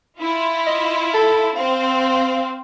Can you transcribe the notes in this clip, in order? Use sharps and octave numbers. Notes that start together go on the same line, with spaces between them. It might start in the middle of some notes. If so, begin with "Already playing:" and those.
E4 F4
D#5
A4
C4 F5